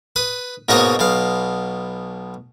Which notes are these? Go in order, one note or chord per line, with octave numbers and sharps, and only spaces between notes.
B4 D#6
G#2 B2 A#3 F#4 C#5 D#5
B1 B2 F5